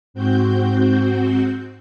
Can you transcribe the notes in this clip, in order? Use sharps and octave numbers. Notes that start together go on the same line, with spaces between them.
G#2 C4 F#4 G6